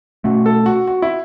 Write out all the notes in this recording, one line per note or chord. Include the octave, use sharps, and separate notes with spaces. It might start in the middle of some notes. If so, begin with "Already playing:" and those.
B2 A3 C#4 F#4
A4
F#4
F#4
E4